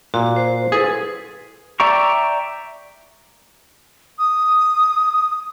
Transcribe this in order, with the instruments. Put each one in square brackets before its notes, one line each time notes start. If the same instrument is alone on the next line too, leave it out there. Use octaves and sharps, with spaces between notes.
[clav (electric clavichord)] A#2 [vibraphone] F#4
[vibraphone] C5
[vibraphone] E4 A4 B4 [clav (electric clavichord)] G#4
[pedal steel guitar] D5 E5 G5 A#5 C#6
[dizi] D#6